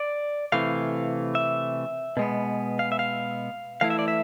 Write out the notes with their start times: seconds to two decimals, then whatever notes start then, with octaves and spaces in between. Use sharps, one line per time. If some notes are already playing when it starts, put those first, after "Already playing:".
Already playing: D5
0.52 C3 E3 A3 F5
1.35 E5
2.17 B2 G#3 B3
2.79 F5
2.92 E5
2.99 F5
3.81 E3 A3 E4 F5
3.90 E5
3.99 D5
4.08 E5